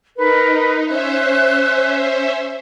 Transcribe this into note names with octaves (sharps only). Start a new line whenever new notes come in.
D#4 A#4 B4
C#4 C5 E5 F#6